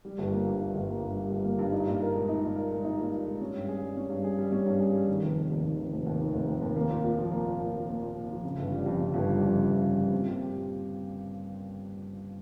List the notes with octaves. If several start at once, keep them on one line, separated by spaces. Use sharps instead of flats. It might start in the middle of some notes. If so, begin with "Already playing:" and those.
G3
G1
A#3
G2
G3
G1
A#3
G2
G3
G1
A#3
G2
D#4
A#2
A#4
G#3
D#4
A#2
A#4
G#3
D#4
A#2
A#4
G#3
C#4
G2
G#4
G3
C#4
G2
G#4
G3
C#4
G2
G#4
G3
D#3
F1
F1
D#2
D#3
F1
F1
D#2
D#3
F1
F1
D#2
A#3
A#2
A#2
F3
A#3
A#2
A#2
F3
A#3
A#2
A#2
F3
C#3
G1
G3
F2
C#3
G1
G3
F2
C#3
G1
G3
F2
C4
A#2
G4